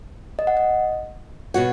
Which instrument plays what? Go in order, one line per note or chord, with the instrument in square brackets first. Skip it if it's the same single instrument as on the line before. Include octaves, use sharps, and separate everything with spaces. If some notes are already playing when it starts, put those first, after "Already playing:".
[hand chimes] D#5
F#5
D#5
[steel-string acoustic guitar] B2 B3 F#4 C#5 [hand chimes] F#5